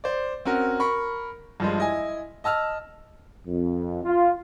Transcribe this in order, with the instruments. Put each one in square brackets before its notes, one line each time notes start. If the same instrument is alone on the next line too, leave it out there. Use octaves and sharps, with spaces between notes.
[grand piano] C5 D5
C4 C#4 F#4 A#4
A#4 B5 C#6
G2 F3 G#3
E4 D#5 G#5
D#5 A5 E6 F6
[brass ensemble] F2
F4